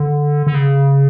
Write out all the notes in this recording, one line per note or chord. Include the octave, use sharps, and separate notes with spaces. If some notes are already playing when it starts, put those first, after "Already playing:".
Already playing: D3
D3
C#3